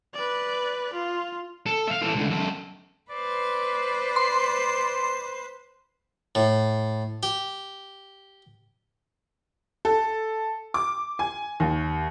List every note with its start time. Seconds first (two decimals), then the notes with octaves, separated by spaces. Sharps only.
0.14 B4 D5
0.93 F4
1.66 A4
1.87 E5 F5
2.03 E3 A4
2.15 C#2 D3
2.30 F#2 A4
3.11 B4 C5 D5
4.16 C6
6.35 A2
7.23 G4
9.85 A4
10.74 D6
11.19 G#5
11.60 D#2